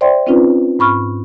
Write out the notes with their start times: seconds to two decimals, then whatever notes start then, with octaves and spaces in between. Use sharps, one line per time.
0.01 C5 D5 E5 G5 C6
0.27 C4 C#4 D#4 F4 B4
0.79 G#2 B5 C#6 F6